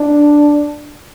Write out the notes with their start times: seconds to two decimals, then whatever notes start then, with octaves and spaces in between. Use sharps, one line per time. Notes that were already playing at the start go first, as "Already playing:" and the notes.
Already playing: D4